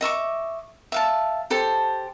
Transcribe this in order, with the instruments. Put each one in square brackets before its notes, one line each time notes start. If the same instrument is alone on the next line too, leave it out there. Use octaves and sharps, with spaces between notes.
[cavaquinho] D#5 E5 C#6 D6
E5 F5 A5
G4 A4 C5 A5